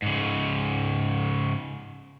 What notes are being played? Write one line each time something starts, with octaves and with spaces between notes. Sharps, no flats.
G#2 C#3